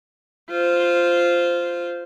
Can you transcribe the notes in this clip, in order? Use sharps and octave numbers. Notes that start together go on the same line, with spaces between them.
F4 C5